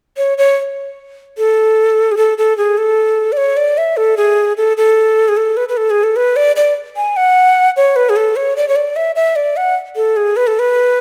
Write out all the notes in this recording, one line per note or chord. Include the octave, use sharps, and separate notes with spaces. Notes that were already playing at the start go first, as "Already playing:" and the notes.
C#5
C#5
A4
G#4
A4
A4
G#4
A4
D5
C#5
D5
E5
A4
G#4
A4
A4
G#4
A4
B4
B4
A4
G#4
A4
B4
D5
D5
G#5
F#5
C#5
B4
G#4
A4
C#5
D5
C#5
D5
E5
E5
D5
F#5
A4
G#4
B4
A4
B4